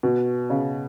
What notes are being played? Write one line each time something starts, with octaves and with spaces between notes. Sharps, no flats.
B2
C#3